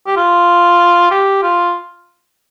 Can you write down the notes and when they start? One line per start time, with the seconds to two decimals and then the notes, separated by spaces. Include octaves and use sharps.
0.07 G4
0.17 F4
1.11 G4
1.43 F4